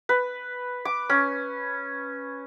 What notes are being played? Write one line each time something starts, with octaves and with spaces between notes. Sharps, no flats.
B4
D6
C#4